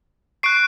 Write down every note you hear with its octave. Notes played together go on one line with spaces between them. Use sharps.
C#6 F#6 C7 D7